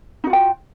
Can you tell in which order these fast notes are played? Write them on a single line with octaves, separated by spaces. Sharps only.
D#4 F#4 F4 G5